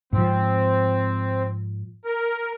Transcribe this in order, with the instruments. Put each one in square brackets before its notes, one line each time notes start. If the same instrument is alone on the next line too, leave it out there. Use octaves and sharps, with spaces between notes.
[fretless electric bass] G#2 F3 [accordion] C4
[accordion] A#4